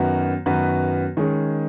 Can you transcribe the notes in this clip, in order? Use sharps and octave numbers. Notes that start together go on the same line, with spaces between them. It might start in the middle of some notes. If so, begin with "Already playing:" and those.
Already playing: F#2 D#3 B3 F#4 B4
F#2 D#3 B3 F#4 B4
D#3 G#3 C#4 G#4